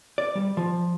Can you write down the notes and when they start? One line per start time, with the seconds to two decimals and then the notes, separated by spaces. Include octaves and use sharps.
0.18 D5
0.35 G3
0.57 F3